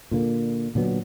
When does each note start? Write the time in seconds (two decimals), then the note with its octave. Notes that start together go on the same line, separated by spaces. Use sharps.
0.11 A#2 D3 A#3
0.75 A#2 D3 F#3 B3